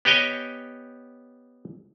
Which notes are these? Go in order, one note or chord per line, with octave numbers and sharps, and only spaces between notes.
B3 G4 C#5 D#5 G5 G#5